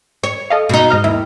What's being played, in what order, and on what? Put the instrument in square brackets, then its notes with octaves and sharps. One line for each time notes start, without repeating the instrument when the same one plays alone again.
[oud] C#5
[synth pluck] A4 D#5 F5
[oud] B2 D#4
[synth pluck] G#2 D#5 F6
[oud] D#2 [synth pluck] E4